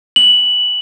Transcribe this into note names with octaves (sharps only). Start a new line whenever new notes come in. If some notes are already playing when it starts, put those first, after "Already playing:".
F#7